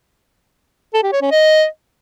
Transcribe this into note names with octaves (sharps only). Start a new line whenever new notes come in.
A4
G4
C#5
C#4
D#5